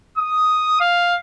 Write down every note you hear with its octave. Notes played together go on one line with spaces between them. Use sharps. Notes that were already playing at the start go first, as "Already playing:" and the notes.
D#6
F5